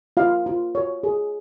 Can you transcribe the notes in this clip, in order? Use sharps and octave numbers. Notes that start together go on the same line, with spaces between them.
F4 F5
F4
C#5
G#4